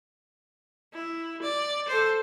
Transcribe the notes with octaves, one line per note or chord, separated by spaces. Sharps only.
E4
D5
A4 C5